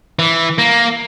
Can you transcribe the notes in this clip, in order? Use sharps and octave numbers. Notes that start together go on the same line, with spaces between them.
E3
A#3